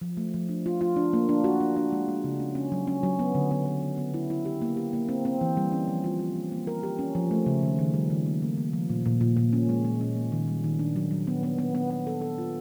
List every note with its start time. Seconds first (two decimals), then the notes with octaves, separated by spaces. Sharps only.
0.01 F3
0.17 A3
0.34 F3
0.49 D4
0.66 F4
0.81 F4
0.96 D4
1.13 A#3
1.29 D4
1.44 F#4
1.60 D4
1.76 D4
1.92 G#3
2.08 G#3
2.24 C#3
2.40 C#4
2.55 C#4
2.72 F#3
2.87 C#4
3.03 F#3
3.19 B3
3.35 D3
3.51 B3
3.66 B3
3.82 B3
3.98 B3
4.14 E4
4.30 E4
4.45 G4
4.62 A#3
4.77 G4
4.93 A#3
5.09 C4
5.25 C4
5.41 E3
5.57 G3
5.72 C#4
5.88 F3
6.04 F4
6.19 F4
6.36 A#3
6.52 A#3
6.67 A#4
6.83 G4
6.99 C#4
7.15 F3
7.31 A3
7.46 C#3
7.63 D#3
7.79 D#3
7.94 G3
8.10 D#3
8.26 A#3
8.42 A#3
8.58 A#3
8.73 F3
8.89 A#2
9.06 A#2
9.21 A#2
9.37 A#2
9.53 C#4
9.69 G#3
9.85 G#3
10.01 C#4
10.16 A#3
10.32 D#3
10.47 G3
10.64 D#3
10.79 D4
10.96 F#3
11.11 F#3
11.27 B3
11.43 B3
11.58 B3
11.75 B3
11.90 B3
12.07 A4
12.21 A4
12.38 F4